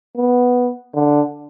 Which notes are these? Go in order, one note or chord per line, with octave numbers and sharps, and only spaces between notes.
B3
D3